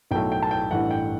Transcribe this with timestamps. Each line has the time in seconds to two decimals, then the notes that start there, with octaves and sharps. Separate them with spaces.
0.11 B1 A2 F#3 A3 G5
0.32 G5
0.42 A5
0.51 G5
0.71 A1 G2 E3 A3 F#5
0.91 G5